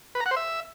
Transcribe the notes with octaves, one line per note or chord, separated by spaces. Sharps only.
B4
A#5
F#5
C5
E5